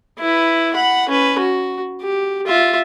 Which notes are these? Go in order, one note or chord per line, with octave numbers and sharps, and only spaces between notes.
E4 B4
F#5 B5
C#4 B4
F#4
G4
F4 E5